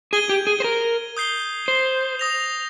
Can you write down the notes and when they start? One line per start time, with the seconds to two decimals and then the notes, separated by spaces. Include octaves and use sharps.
0.13 G#4 G#6 D#7 G7
0.29 G4
0.47 G#4
0.60 C5
0.64 A#4
1.17 D#6 G6 C7 G7
1.68 C5
2.19 D#6 A#6 F7